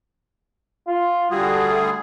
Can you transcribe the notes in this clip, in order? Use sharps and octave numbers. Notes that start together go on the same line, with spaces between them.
F4
D3 G3 F#4 G#4
A3